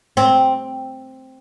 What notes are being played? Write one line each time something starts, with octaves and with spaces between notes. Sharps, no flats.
C4